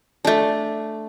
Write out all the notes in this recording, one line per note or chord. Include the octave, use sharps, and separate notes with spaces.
A3 D4